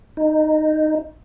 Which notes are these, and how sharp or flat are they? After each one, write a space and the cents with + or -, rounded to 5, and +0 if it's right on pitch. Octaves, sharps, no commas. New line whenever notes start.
D#4 -10